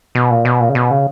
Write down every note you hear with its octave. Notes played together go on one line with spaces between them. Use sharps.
B2
A#2
B2
A#2
C#3
B2
C#3